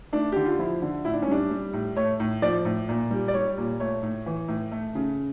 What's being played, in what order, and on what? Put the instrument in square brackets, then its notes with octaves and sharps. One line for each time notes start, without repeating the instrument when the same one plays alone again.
[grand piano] A3 D4
D3 G4
F4
F3 E4
D3
A2 E4
D4
C#4
G3 D4
G3
A2
A3 C#5
A2
F3 D5
A2
A#2
G3
D5
G3 C#5
A#2
A3 C#5
A2
E3
A2
A3
C#3